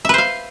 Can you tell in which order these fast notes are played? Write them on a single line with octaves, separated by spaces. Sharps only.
E5 B4 C5 F5